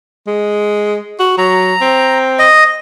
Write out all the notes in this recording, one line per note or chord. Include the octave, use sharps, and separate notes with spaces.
G#3
F#4
F#3 A#5
C4
D#5